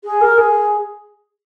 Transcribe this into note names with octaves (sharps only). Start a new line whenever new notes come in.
G#4
A#4
G#4